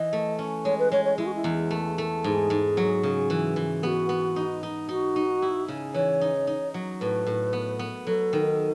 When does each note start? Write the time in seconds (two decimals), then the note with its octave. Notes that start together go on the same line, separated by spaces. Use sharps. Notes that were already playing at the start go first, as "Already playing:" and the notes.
Already playing: E3 D#5
0.13 A3
0.39 C#4
0.65 G#3 C#5
0.79 B4
0.92 G#3 C#5
1.05 C#5
1.18 G#3 E4
1.26 F#4
1.35 E4
1.44 E2
1.71 A3
1.98 A3
2.24 G#2 G#4
2.50 G#2
2.77 F#3
3.03 C#3
3.30 E3
3.56 E3
3.82 B3 F#4 G#4
4.09 B3
4.36 D#4
4.63 D#4
4.88 D#4 F#4
5.16 D#4
5.42 E4
5.68 C#3
5.94 E3 C#5
6.21 D#4
6.47 D#4
6.74 F#3
7.01 A2 B4
7.27 A2
7.53 B3
7.79 B3
8.06 F#3 A4
8.33 D#3